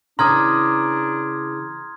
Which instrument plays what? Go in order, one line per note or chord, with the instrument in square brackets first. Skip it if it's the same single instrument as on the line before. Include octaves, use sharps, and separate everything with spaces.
[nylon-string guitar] C#3 E3 [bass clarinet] D4 [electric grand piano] A#5 D#6 [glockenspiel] C6 F6 G#6